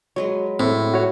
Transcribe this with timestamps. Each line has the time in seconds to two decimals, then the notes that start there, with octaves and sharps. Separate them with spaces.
0.16 F#3 G#3 B4 C#5
0.60 A2 C4
0.94 F#4 C#5